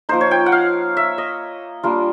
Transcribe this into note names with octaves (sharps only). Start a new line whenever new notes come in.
F3 A#3 D#4 C5
C#5
G5
F#5
F5
E5
D#5
G3 A#3 D4 F4